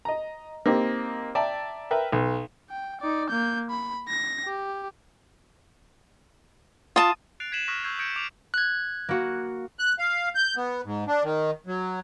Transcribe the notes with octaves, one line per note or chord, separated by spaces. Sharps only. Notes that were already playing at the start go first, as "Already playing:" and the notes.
D#5 A#5
A#3 C4 D#4 G4
D5 E5 G5 A5 A#5
A#4 B4 E5 G5
B1
G5
D#4 D5
A#3 G6
B5
A#6
G4
F4 A5 D#6
F#6 A6 C7 D7 F7
G#6 B6 C7 D#7 E7 F#7
C#6 D#6 F6 F#6 A#6 B6
C#6 E6 G6 G#6 C7
D#6 G6 G#6 A#6 C#7 D7
D6 D7 F7
F#6 G#6
A#3 F#4
F#6
F5
G6
B3
G#2
D4
D#3
F#3